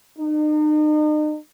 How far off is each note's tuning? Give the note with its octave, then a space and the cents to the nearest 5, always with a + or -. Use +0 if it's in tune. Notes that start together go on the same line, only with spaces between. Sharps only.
D#4 -40